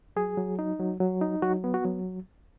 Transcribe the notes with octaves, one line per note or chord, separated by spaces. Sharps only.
F#3 G#4
F#3
D#4
F#3
F#3
D#4
F#3 F#4
B3
F#4
F#3